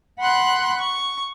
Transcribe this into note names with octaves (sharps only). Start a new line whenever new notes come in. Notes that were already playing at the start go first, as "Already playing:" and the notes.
F#5 B5 C6 F#6
C#6